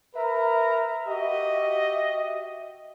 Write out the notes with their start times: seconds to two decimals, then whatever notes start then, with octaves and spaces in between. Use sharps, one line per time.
0.15 A#4 B4 E5 A#5
1.07 F#4 G4 D#5